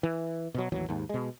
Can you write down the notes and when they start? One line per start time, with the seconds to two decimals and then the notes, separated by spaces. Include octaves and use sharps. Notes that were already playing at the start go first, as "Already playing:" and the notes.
0.03 E3
0.54 B2 F#3
0.72 A1 D#2 E3 F#3
0.89 D#2 G#2
1.09 B2 G#3